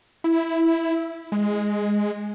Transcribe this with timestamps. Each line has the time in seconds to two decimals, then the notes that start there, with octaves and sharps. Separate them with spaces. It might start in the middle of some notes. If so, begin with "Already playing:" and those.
0.24 E4
1.32 G#3